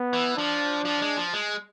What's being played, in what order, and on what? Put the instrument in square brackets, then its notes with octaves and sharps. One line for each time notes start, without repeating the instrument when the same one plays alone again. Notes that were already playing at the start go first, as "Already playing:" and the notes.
Already playing: [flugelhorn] B3
[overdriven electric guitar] E3
[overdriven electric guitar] F3 [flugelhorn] D4
[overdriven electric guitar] F3
G#3
F3
G#3